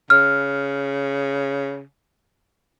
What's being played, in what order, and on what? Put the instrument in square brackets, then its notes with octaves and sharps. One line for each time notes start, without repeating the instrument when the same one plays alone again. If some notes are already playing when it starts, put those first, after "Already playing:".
[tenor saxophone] C#3 [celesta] F6